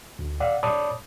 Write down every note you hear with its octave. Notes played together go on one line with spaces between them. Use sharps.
D2
D5 F5 F#5
C#5 D5 A5 B5 D6 D#6